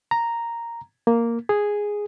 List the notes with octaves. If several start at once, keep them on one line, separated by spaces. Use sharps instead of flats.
A#5
A#3
G#4